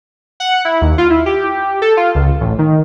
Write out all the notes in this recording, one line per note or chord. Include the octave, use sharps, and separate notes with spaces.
F#5
E4
D#2
F4
E4
G4
A4
F4
C#2
A1
D#3